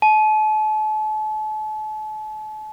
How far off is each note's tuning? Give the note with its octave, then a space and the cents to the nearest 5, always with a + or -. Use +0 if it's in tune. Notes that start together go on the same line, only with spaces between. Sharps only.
A5 -40